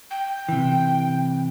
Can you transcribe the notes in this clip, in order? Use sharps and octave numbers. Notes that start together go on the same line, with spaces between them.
G5
C3 E3